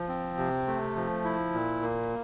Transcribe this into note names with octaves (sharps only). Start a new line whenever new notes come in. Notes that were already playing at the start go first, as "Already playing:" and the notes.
Already playing: F3
C4
C3
A3
F3
E4
A#2
A#3